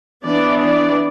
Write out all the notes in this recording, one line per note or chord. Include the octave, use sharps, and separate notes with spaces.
E3 B3 D4 D5
D5